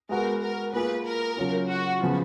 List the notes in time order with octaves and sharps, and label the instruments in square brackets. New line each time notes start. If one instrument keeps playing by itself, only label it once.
[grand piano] G#3 B3 F#4 [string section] A#4
[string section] A#4
[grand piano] A#3 F4 G#4 [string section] B4
[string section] A#4
[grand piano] C#3 F#3 C#4 F4
[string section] F#4
[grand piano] C#3 F3 B3 F4